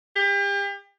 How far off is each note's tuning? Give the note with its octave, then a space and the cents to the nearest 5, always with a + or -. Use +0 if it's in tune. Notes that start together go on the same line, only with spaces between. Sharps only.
G4 +35